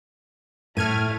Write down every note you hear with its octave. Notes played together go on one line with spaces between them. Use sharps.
A2 A3 F6 G#6 D#7